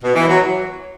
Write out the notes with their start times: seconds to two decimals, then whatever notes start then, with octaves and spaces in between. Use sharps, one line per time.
0.03 B2
0.15 E3
0.28 F#3